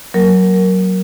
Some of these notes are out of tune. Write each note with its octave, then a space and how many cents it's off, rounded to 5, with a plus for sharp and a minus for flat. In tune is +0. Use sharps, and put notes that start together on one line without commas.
F#3 +10 A#3 +0 A#4 +0